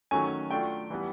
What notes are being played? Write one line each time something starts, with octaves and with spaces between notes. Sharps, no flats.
D#3 F#3 A3 C#4 G#5
F#3 A3 D4 F4 G5
E3 G3 B3